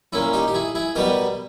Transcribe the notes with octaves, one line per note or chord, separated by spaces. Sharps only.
A#2 A#3 C#4 E4
D#4 G4
G4
E4 G#4
E4 G#4
B2 G3 B3 G4 A#4